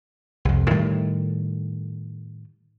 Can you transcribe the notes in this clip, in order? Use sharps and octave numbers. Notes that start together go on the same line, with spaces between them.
C2 F2
A2 D#3 G3 A3